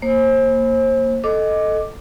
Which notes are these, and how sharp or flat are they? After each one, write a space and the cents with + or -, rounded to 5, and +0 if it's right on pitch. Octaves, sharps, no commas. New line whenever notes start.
A#3 -5 C5 +30
A4 +0 D#5 +0 D6 +5